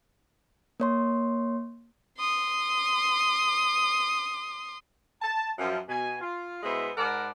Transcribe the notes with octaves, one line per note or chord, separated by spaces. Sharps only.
A#3 C#5 C6
C6 D#6
A5
F#2 F3
B2 G#5
F4
B2 G#3 B3 E4 C5 E5
G#2 A#4 D5 F#5 A5 B5